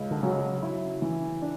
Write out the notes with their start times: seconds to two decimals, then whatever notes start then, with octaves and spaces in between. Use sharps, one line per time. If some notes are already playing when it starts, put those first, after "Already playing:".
Already playing: C#2
0.11 D3
0.23 C#3 F#3
0.62 E4
1.02 E3
1.42 D4